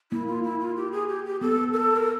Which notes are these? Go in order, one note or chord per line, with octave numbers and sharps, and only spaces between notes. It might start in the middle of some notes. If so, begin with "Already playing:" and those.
A#3 E4
F4
E4
F4
G4
G#4
G4
G4
B3 A4
A#4
A4
A#4